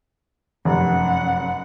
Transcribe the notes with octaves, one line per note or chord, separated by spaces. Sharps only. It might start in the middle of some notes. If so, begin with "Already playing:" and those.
F1 F#2 F#5